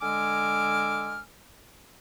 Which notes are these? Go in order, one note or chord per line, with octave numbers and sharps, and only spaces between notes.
D3 G#3 G#5 D6 E6 F6